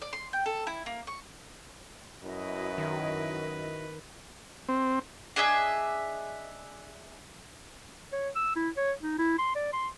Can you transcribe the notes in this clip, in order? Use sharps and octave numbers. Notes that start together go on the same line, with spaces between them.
D5
C6
G5
A4
E4
A#3
C#6
F#2 E4 F#4 B4 D#5
D#3
C4
D4 G#4 D#5 E5
C#5
E6
E4
C#5
D#4
E4
C6
D5
C6